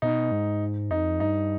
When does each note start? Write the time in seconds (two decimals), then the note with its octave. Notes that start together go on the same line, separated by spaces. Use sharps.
0.02 B2 D#4
0.32 G#2
0.91 F2 D#4
1.20 G2 D#4